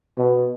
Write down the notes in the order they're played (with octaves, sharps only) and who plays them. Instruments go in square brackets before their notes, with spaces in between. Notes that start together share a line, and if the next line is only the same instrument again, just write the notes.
[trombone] B2